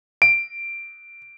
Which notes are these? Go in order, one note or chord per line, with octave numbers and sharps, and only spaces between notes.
D7